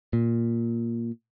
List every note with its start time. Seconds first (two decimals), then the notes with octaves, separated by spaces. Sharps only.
0.13 A#2